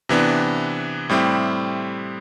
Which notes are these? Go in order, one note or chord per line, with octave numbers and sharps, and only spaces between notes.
C3 E3 B3 D4
A2 G3 C4 E4 G4